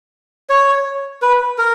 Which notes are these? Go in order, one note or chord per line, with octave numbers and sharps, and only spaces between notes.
C#5
B4
A#4